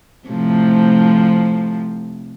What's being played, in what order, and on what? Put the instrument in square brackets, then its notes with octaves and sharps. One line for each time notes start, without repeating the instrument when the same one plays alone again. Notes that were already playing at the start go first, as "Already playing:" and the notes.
[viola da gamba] A2 C3 F3